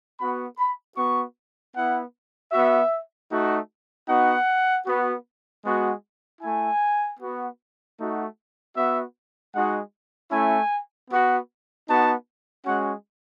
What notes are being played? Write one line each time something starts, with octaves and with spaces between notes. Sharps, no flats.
B3 F#4 B5
B5
B3 F#4 C#6
B3 E4 F#5
B3 F#4 E5
A3 D#4 F#4
B3 D#4 F#4 F#5
B3 F#4
G#3 B3 F#4
A3 E4 G#5
B3 F#4
A3 D#4 F#4
B3 F#4 E5
G#3 D#4 F#4 F#5
A3 C#4 E4 G#5
B3 F#4
B3 D#4 F#4 A5
G#3 C#4 F#4 F#5